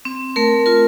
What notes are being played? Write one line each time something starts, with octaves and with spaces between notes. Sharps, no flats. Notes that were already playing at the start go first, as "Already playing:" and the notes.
C4
A3 A#4
F4 A#4